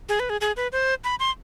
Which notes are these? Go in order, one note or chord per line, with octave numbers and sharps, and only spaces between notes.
G#4
B4
G#4
G#4
B4
C5
B5
C6